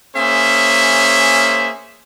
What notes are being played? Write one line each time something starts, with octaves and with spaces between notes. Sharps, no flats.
A#3 C#4 G#4 C5 E5